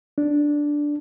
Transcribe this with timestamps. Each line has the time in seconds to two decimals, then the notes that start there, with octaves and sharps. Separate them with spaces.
0.18 D4